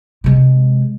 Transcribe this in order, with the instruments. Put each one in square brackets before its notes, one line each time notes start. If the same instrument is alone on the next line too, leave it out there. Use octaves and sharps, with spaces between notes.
[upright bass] C3 G#3